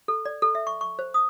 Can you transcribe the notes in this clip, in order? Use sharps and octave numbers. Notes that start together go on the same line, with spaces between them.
A4
D5
A4
E5
C#6
C#6
C5
D#6